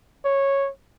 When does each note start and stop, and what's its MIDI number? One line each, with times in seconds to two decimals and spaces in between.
0.25 0.69 73